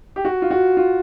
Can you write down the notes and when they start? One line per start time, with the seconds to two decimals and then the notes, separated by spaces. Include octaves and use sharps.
0.16 G4
0.25 F#4
0.42 F4
0.51 F#4
0.77 F4